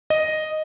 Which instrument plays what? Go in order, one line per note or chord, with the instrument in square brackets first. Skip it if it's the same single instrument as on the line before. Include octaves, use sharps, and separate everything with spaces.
[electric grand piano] D#5